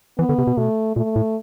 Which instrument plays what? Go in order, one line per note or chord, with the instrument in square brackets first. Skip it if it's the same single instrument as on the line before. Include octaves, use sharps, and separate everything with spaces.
[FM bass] E3 [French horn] B3
[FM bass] D3
C3
B2
[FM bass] B2 [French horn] A3
[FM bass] A#2 [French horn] A3
[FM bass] A2